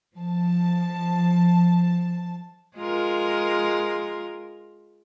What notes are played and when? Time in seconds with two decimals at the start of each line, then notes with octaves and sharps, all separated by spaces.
0.15 F3 A5
2.77 G#3 F4 A#4